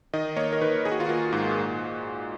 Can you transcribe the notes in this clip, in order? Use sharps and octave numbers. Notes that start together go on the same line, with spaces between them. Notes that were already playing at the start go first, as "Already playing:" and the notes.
D#3 D#5
A#3 C#5
A#4
D#3 B4
D#3 G#4
F#4
F4
A#3 F#4
G#2
A#2